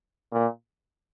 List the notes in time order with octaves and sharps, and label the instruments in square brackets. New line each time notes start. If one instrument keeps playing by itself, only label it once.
[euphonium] A#2